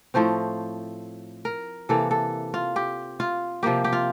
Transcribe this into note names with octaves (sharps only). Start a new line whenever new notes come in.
A2 F3 A3 C4 C5
A#4
C3 E3 A#3 A4
A4
F4
G4
F4
C3 F3 A#3 G4
G4
F4